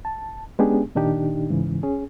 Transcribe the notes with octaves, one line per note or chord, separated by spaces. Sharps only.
A5
G#3 B3 C#4 D4 G4 G#4
A#2 D#3 D4 D#4 G4
G#2 C#3 E3
C#4 G#4